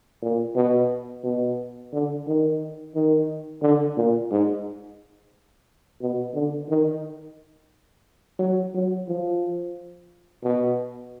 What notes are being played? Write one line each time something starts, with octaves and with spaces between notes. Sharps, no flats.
A#2
B2
B2
D3
D#3
D#3
D3
A#2
G#2
B2
D3
D#3
F#3
F#3
F3
B2